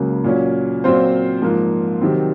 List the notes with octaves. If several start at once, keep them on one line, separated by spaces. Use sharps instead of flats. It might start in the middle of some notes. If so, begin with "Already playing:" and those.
Already playing: C#2 C#3 F#3 A#3
A#2 F#3 C#4
A#2 F#3 C4 F4 C5
G#2 F3 A#3
C3 D#3 F#3 C4